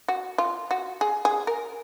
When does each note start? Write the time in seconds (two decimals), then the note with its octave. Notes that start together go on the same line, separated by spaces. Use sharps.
0.08 F#4
0.38 F4
0.71 F#4
1.01 G#4
1.25 G#4
1.47 A#4